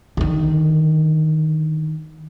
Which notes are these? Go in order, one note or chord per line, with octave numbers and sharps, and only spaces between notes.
D3 D#3